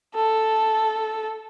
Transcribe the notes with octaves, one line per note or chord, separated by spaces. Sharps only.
A4